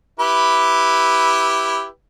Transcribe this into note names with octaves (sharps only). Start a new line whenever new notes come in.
E4 G4 B4